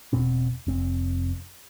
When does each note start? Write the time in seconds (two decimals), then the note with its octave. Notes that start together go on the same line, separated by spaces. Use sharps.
0.13 E1 B2 C4
0.67 F1 C4